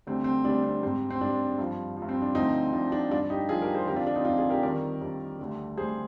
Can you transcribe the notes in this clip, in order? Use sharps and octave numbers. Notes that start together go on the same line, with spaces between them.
D2 D3 G3 C4
C4
D2 D3 G3 D4
C4
G#2 G3 C4
C4
G#2 G3 D4
G2 F3
F3
G2
C4
D4
D2 D3 F3 C4 D#4
D2 D3 F3 D4
D4
G2 F3 D4 F4
D#4 G4
G2 F3 F4 G#4
G4 A#4
G#4 C5
F2 D3 F3 G4 A#4
D4 F4
D4
C4 D#4
F2 D3 F3 D4 F4
F4 G#4
G4 A#4
F2 D#3 G3 A#4 D5
F2 D#3 G3
D2 D3 G3
D2 D3 G3 G#4 C5